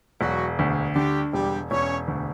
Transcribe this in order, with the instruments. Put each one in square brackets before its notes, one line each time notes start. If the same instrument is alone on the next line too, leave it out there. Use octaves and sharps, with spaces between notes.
[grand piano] E1 [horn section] F#3 F#4
[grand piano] D2
[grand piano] D3 [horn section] G3 G4
[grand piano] E1 [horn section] G3 G4
[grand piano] E1 [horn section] C#4 C#5
[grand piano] D2